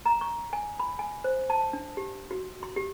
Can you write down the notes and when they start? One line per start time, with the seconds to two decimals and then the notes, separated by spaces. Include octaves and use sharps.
0.05 A#5
0.21 C#6
0.53 G#5
0.79 B5
0.99 G#5
1.24 C5
1.50 A5
1.73 D4
1.97 G4
2.31 F#4
2.63 C6
2.76 G4